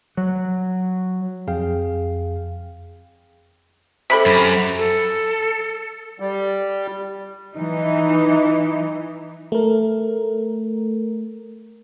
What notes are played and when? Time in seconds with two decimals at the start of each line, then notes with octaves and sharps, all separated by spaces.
0.17 F#3
1.47 F2 G#4 F5 G5
4.10 C3 G3 A4 B5 B6
4.26 F#2
4.78 A4
6.20 G3
7.55 E3 D#4
9.52 A3 A#4